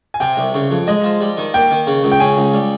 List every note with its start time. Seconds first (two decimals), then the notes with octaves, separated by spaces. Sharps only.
0.14 G#5
0.20 C3 G5
0.37 C2
0.54 C#3
0.70 F2
0.87 G#3 D#5
1.04 F3
1.21 G3
1.37 D#3
1.54 A#3 G5
1.71 D#3
1.87 C#3
2.04 C#2
2.12 G5
2.20 C#3 G#5
2.37 C#2
2.54 G3